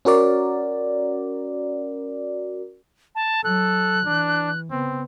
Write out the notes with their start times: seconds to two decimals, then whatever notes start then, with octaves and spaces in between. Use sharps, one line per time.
0.05 C#4 F#4 A#4 D5
3.15 A5
3.44 F#3 A4 F#6
4.06 E3 D4
4.71 C#3 B3 C4